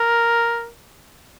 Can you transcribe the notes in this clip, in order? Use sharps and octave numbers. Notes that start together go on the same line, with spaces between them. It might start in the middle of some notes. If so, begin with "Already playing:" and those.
Already playing: A#4